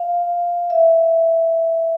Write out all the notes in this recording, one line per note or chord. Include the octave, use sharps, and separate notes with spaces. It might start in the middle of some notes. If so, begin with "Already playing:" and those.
Already playing: F5
E5